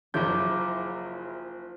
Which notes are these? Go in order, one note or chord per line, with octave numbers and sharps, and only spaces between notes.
F#1 C#3 F3 F#3 E4 C#5 D6 G6